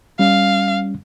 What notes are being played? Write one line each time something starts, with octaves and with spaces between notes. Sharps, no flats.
G3 C#4 F5